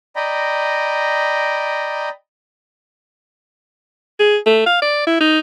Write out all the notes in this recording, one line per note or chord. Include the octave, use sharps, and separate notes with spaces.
D5 D#5 G5 A#5 B5
G#4
A3
F5
D5
E4
D#4